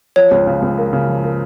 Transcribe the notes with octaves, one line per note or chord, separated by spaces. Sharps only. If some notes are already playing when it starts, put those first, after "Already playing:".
F3 C#5
C#2
C#3
C#2
A#3
C#3
F3
A#3